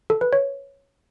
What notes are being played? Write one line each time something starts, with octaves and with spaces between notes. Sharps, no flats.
A4
B4
C#5